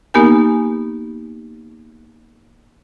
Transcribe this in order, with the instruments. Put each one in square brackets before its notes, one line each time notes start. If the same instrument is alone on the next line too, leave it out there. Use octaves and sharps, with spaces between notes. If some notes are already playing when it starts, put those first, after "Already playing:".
[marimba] A#3 B3 D#4 G4 A#4 G#5